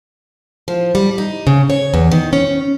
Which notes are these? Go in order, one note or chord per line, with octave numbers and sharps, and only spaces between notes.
F3
G3
D#4
C#3
C#5
E2
D#3
C#4